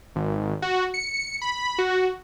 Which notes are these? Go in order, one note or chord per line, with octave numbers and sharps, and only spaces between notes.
G#1
F#4
C#7
B5
F#4